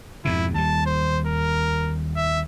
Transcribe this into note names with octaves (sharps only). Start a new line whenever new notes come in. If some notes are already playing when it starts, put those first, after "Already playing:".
F2 G#2 B2 E4
D#2 G3 A5
C5
A#4
E5